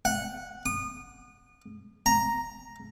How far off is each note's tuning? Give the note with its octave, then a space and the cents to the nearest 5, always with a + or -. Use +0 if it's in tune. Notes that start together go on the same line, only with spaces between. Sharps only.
F#5 -10
D#6 -35
A#5 +0